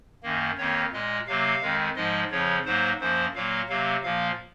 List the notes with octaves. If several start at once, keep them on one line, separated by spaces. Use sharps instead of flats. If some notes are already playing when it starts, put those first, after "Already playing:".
F#2 D#3 A#3
F2 D#3 A#3 C#5
A#2 G#3 D#5
C3 F#3 A#3 F5
F2 D#3 G#3
G#2 F3 G#3 D#5
F2 C#3 F3 C#5
G#2 F#3 A#3 C5
F#2 F3 A#3 C5
A#2 F#3 A#3 F5
C3 F#3 A#3 F5
A#2 F3 A#3 F5